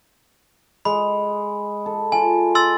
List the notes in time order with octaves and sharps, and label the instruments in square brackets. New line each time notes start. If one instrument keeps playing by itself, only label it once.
[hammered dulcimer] G#3 [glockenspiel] B5
[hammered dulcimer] A4
[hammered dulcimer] F4 [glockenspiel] G#5
[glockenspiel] C6 E6 A6